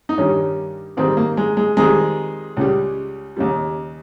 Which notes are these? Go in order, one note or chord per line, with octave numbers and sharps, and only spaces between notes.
D#4
G2 D#3 G3 C#4
G#2 D#3 G3 C4
A#3
G#3
G#3
F2 D#3 G3 G#3
C#2 C#3 G3
D#2 C#3 G3